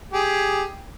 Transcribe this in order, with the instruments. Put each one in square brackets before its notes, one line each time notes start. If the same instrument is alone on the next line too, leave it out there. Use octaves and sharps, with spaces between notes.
[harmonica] G4 G#4